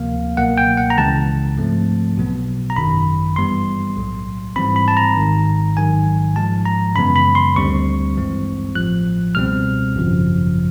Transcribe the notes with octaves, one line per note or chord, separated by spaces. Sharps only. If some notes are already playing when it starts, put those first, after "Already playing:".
Already playing: D2 C3 F3 A#3 F5
C#2 B2 F#3 A#3 F#5
G5
F#5
A#5
C#2 C#3 E3 G#3 A5
G#2 F3 A3 C4
B1 B2 F#3 B3
A#5
G#1 F#2 D#3 B5
G2 E3 G3 B3 C6
B1 A2 F#3
G#2 E3 G3 C4 B5
B5
A5
A#5
G#1 G#2 D#3
A1 G#2 D#3 F#3 G#5
G#2 F3 G#3 A5
A#5
F#2 C#3 E3 G#3 B3 B5
B5
C6
D2 D3 G3 C4 C#6
A1 G2 E3 G#3 C4
A1 A2 F3 F#6
C#2 B2 G3 C4 F6
G#1 F#2 C#3 F3